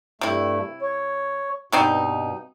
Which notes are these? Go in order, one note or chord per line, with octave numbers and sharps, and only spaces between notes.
G2 C3 A3 E4
C#5
G2 B2 B3 C4 D#4